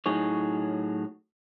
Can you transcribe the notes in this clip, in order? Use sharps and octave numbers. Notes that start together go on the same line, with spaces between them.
A2 F#3 D#4 G#4 C#5